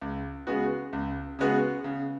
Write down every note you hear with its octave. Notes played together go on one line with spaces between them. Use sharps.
C#2
C#3 G#3 B3 F#4
C#2
C#3 G#3 B3 F#4
C#3